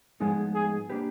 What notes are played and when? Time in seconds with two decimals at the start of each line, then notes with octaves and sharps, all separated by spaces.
0.20 A2 F3 G#3 B3 D#4 G#4
0.55 G#4
0.90 A#3 D4 G4 B4